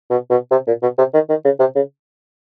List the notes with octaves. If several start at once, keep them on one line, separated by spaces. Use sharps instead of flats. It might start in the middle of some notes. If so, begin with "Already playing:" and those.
B2
B2
C3
A#2
B2
C3
D#3
D#3
C#3
C3
C#3